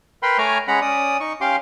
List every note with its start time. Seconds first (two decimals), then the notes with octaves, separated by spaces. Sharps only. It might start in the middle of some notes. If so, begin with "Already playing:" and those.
0.23 A#4 B4 G5 B5 C6
0.38 A3 C#5 G#5 A#5 D6 F6
0.68 G#3 C#4 F#5 A#5 B5
0.82 C#4 D5 D#6
1.20 D#4 C#6
1.41 C#4 G4 F5 C6 D6